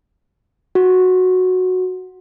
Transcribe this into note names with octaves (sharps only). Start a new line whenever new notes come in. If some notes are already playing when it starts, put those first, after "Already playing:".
F#4